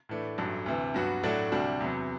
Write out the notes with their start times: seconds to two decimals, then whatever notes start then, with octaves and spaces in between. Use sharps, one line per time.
0.09 A2 E3 A3 D4
0.38 A1 G2 F#3 A3
0.66 D2 C3 E3
0.94 G2 F#3 B3 F#4
1.23 A2 F#3 A3 D4 F#4
1.52 D2 C3 G3 D4 F#4
1.80 E2 C3 F#3